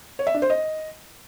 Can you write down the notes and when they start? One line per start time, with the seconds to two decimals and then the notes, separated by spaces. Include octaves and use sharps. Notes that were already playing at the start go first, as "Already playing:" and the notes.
0.19 C#5
0.27 E5
0.34 D4
0.42 C5
0.50 D#5